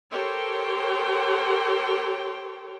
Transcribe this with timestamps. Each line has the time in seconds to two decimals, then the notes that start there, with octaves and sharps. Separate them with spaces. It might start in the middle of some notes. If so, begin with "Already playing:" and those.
0.11 G4 A4 A#4 C5 C#5 G5